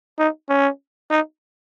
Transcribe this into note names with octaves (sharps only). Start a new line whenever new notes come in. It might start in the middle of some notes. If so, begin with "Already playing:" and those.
D#4
C#4
D#4